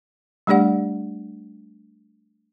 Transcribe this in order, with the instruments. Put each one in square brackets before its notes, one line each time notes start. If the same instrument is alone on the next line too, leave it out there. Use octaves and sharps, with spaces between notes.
[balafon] G3 A3 D4 G4 D5 F#5